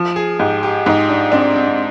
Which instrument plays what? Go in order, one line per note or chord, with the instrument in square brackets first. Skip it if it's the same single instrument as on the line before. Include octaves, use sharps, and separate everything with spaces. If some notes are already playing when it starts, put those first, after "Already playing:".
Already playing: [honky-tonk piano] F3
[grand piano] G#4
[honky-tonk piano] G#2 [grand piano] G4
[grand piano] G4
[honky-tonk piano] G#2 [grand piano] D#4
[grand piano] D4
[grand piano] C4 [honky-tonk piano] D4
[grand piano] C4
C4